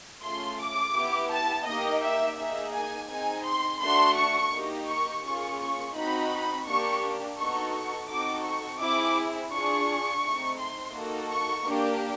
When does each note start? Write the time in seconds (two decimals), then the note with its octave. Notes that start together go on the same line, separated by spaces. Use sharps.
0.24 A3 C#4 F4 G#4 C6
0.61 D6
0.95 B3 E4 G4
1.31 A5
1.67 A#3 D#4 G4 D#5
2.03 E5
2.38 A#3 D#4 G#4 E5
2.74 G#5
3.09 C4 D#4 G#4 G#5
3.45 C6
3.80 A3 D4 F#4 C6
4.17 C#6
4.52 A#3 D#4 G4
4.88 C#6
5.23 A#3 C#4 F4 G#4 C#6
5.60 C#6
5.95 C4 D#4 F#4 B5
6.66 A#3 D4 G4 C#6
7.37 B3 D#4 F#4 A4 C#6
7.73 C#6
8.08 C4 D#4 F#4 A4 D6
8.44 C#6
8.80 C4 E4 G#4 D6
9.51 D4 F4 G#4 C#6
10.22 A3 C4 D#4
10.58 C6
10.94 A#3 D#4 F#4 A4
11.30 C#6
11.65 A#3 D4 G4